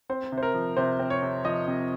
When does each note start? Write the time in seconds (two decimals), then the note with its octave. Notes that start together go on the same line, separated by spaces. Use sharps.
0.09 C4 C5
0.32 C3
0.38 C5
0.43 A#4
0.54 F3
0.77 C3 C5
0.99 C4
1.10 C#5
1.22 C3
1.44 F3 D#5
1.67 C3